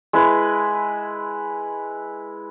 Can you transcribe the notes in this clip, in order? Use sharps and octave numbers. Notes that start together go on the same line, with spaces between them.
G#3 E4 B4